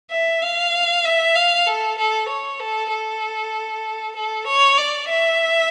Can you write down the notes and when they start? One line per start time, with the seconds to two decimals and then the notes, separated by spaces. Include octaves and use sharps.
0.11 E5
0.42 F5
1.05 E5
1.36 F5
1.67 A4
1.98 A4
2.28 C#5
2.60 A4
2.91 A4
4.16 A4
4.47 C#5
4.78 D5
5.09 E5